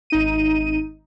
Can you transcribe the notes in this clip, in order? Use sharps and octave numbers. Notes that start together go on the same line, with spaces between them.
G#1 D#4 D#7